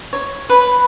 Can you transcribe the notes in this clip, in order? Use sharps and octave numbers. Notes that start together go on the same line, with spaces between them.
C#5
B4